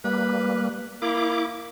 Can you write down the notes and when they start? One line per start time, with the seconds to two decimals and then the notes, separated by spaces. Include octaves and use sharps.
0.04 G3 A#3 B4
1.02 A#3 E4 D6